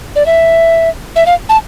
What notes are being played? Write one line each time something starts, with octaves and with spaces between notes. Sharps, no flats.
D5
E5
E5
F5
A5